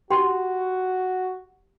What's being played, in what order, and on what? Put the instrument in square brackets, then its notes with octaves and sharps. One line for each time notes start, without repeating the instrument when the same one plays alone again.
[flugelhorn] F#4 [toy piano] G4 G5 C6